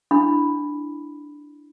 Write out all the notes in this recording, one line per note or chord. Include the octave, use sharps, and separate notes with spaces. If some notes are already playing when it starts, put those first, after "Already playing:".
D4 E4 F#5 B5